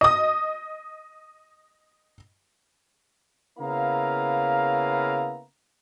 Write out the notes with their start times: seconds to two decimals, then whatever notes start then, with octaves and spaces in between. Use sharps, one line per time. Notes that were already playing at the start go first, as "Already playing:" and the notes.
0.01 D#5 D#6
3.59 C#3 A#3 B3 E4 F5 A#5